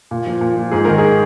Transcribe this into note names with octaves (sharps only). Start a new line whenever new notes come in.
A#2
F3
A#2
F3
G#2 G#4
D#3 A#4
G#4